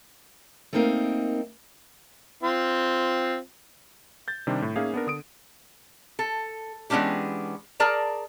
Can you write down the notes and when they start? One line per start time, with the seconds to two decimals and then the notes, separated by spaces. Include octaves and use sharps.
0.73 A3 A#3 C4 D#4 A#4 F5
2.43 C4 F4
4.28 G6 A6
4.47 C3 D#3 G3 D4 C5
4.62 A2
4.76 A#3 C#4 D#4 G#4 E5 F5
4.94 B3 D4 A#4
5.07 D3 D#6 D7
6.19 A4
6.90 E3 G#3 B3 C#4 D4 G4
7.80 G#4 A#4 D5 A5 A#5